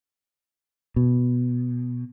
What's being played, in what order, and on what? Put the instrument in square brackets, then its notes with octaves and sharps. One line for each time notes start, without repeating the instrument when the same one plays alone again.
[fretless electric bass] B2